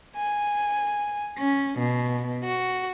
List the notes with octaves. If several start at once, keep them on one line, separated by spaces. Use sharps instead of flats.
G#5
C#4
B2
F#4